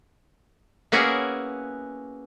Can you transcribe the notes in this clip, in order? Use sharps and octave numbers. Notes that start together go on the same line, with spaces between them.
A#3 B3 C#4 E4 F#4 G#4